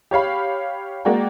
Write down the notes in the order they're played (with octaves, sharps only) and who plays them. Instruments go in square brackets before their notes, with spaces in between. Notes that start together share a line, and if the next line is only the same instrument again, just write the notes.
[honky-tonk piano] G4 C#5 F5 B5
G#3 A#3 F#4 D5 G5